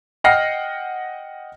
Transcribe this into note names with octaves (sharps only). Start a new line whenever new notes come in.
D#5 F#5 G5 F6 A#6 C7